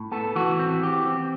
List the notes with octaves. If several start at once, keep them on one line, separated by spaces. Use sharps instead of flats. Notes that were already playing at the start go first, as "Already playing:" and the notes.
Already playing: A2
B3 A4
E3 F#4
C4
E3 G4
C4